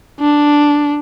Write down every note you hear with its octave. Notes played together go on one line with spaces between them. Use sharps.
D4